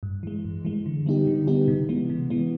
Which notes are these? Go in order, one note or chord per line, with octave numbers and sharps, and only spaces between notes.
G2
E3 G#3
G2
E3 G#3
D3
G3 B3 D#4 G4
D3
G3 B3 D#4 G4
C3
E3 G#3 B3
C3
E3 G#3 B3